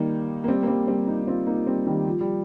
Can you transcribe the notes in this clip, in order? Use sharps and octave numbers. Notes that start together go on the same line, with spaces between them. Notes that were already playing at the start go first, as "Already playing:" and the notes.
Already playing: D#3 G3 A#3 D#4
A#3
G3 C4
A#3
G3 C4
G3 C4
A#3 D#4
D#4
C4 F4
A#3 D#4
G3 C4
D#3 G3
F3
G3